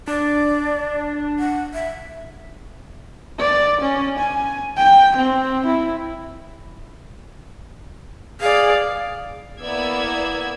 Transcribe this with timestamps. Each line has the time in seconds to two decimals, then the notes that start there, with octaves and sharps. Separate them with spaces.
0.08 D4 D5
1.39 F#5
1.74 E5
3.40 D5
3.81 C#4
4.19 G#5
4.77 G5
5.17 C4
5.66 E4
8.41 G#4 D5 F5
9.62 A#3 B3 E4 D5 E6 G#6